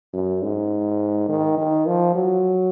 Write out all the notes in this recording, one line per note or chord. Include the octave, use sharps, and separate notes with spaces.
F#2
G#2
D#3
D#3
F3
F#3